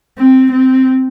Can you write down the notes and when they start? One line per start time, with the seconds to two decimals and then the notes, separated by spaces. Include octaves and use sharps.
0.18 C4
0.52 C4